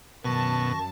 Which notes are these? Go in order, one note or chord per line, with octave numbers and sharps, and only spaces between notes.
F#2 B2 D#3 A5 C#6 A#6